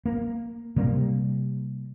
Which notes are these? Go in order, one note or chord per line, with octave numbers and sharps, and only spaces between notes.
A#3
C3 G3 A#3